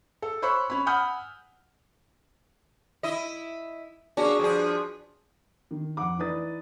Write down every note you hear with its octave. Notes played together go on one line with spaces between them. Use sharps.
A4
C5 C#5 B5 C#6 E6 F#6
C#4 B5
F#5 G#5 B5 D#6 F6 G6
E4 D#5
A#3 C#4 D4 F#4 G#4
G2 F3 D4 G#4
D#3
F2 F#5 D6
E3 D#4 B4 D5 D#6 A6